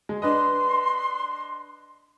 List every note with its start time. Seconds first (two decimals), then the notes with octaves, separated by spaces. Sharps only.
0.09 G#3
0.22 D4 B4 D#5 C6